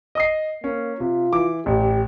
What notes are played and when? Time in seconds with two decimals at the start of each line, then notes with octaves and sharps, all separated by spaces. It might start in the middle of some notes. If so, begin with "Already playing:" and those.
0.15 D#5 D#6 C7
0.64 A#3 C#4
1.00 C3 F4
1.33 E3 D6
1.66 A1 G4